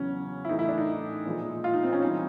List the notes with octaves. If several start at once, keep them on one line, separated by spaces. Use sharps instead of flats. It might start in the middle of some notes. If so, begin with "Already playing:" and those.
Already playing: E2 C#3 F#3 C#4
E4
A2 E3 A3 D#4
E4
D4
D#4
A#2 F3 G#3
F4
D#4
C4
C#4
E3 G3 D#4